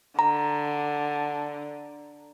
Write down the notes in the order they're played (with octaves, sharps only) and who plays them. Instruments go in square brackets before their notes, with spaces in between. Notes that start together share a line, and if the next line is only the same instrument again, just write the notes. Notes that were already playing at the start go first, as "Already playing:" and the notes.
[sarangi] D3 [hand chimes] A#5